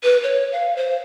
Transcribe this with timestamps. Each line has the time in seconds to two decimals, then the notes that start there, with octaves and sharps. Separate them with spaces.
0.03 B4
0.23 C#5
0.52 F5
0.76 C5